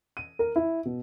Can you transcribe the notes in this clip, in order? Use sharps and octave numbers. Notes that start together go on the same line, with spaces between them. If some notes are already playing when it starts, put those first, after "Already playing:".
D#7
A#4
E4
B2